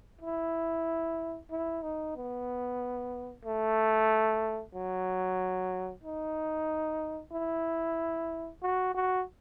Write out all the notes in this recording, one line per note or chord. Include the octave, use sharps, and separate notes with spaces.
E4
E4
D#4
B3
A3
F#3
D#4
E4
F#4
F#4